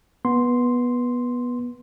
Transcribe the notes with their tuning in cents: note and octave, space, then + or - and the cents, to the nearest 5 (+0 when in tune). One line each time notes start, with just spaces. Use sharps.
B3 -15 C6 +0